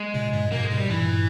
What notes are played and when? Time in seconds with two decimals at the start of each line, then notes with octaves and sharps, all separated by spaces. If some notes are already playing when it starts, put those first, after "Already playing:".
Already playing: G#3
0.14 A#2 C#3
0.33 G2 A#2
0.52 G#2 B2 A#3
0.65 G#3
0.71 G#2 B2
0.77 G3
0.90 G2 A#2 E3